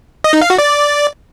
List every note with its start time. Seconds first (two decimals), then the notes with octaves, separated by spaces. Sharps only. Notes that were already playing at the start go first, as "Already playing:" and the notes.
0.24 D#5
0.33 D#4
0.41 F5
0.50 F#4
0.59 D5